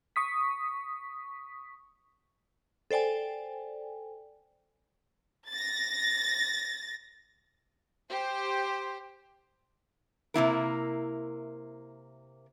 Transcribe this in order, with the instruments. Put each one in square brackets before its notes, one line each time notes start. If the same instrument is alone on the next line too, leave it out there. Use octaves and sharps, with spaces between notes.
[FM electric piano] C#6 D#6 B6
[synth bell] A4 C5 D5 G5 G#5
[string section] A6 A#6
G4 C5
[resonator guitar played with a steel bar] C3 A#3 E4 A#4